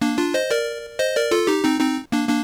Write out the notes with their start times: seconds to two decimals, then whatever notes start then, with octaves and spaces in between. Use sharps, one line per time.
0.01 A#3 D4
0.18 D4 F4
0.34 C5 D#5
0.50 A#4 D5
0.99 C5 D#5
1.16 A#4 D5
1.31 F4 A4
1.47 D#4 G4
1.64 C4 D#4
1.80 C4 D#4
2.12 A#3 D4
2.29 A#3 D4